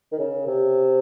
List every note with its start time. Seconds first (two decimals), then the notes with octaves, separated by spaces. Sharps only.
0.12 D#3
0.19 C#3
0.47 C3